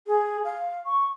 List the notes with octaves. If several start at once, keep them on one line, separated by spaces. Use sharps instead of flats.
G#4
F5
C#6